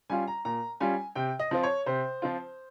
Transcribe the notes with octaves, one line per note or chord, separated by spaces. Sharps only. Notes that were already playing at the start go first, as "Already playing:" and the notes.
G3 C#4 F4 G#5
A#5
A#2 A#5
G3 C#4 F4 G#5
C3 G5
D#5
F3 C4 F4
C#5
C3 C5
F3 C4 F4